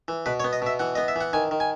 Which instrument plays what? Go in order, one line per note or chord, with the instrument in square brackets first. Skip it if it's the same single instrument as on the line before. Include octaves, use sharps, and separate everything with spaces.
[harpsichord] E3
B2 B4
C#5
B3
D#5
B2 E5
E3 F#5
B3 D#5
E5
E3 F#5
D#3 G#5
D#3
G#5